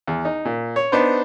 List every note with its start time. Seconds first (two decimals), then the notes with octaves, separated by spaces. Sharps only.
0.08 E2
0.25 D#4
0.45 A#2
0.76 C#5
0.92 B3 D4 D#4 C5